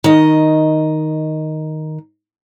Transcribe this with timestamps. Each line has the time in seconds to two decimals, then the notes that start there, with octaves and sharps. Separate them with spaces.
0.04 D#3 D#5